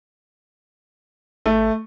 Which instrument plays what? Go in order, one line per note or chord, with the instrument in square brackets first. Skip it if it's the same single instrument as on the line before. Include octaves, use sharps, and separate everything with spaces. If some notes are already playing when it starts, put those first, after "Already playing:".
[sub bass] G#1 [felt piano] A3